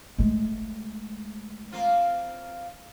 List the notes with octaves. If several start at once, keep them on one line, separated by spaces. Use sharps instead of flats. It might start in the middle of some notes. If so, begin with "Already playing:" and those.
G#3 A3
A#3 C4 F4